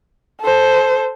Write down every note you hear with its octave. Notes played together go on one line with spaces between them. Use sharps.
A4 C5